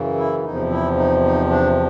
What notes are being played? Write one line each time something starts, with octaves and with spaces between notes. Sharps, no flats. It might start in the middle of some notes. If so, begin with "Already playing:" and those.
Already playing: F#2 C#3 E3
E4
E2 C3 F3 D#4
E4
D#4
D#4
D4